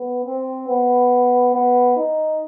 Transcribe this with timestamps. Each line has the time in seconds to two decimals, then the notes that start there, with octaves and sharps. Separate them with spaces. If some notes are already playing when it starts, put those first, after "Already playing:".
Already playing: B3
0.25 C4
0.68 B3
1.54 B3
1.97 D#4